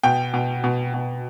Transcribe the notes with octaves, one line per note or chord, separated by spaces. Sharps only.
B2 G5
B2
B2
B2